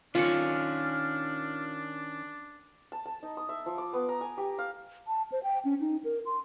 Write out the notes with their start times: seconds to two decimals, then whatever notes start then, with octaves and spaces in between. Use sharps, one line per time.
0.15 D#3 C#4 D4 F4 C#6 F6
2.92 A5
3.06 A5
3.23 D#4
3.37 D#6
3.49 E5
3.66 F3
3.78 D6
3.93 B3
4.09 A#5
4.21 G#5
4.38 G4
4.58 F5
5.07 A5
5.32 C5
5.43 G5
5.65 C#4
5.81 D#4
6.04 A#4
6.26 C6